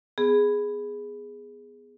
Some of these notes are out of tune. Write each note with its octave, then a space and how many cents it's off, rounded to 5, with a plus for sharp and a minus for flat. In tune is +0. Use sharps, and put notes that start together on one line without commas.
B3 +10 G#4 +0